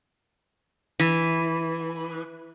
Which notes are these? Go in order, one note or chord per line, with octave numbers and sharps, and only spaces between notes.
E3